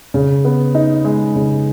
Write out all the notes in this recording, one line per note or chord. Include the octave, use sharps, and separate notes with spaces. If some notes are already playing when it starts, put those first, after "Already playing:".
C#3
B3
D#4
G#3
C#3